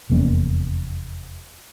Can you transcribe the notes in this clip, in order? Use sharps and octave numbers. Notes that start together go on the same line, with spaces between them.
F1 E2 A#3 C#4